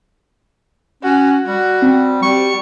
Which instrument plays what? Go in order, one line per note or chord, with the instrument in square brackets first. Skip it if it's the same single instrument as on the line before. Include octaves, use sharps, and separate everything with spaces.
[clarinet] C#4 [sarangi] F#4
[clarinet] G3 [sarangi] F#4
[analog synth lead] C4
[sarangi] G3 [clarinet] C#6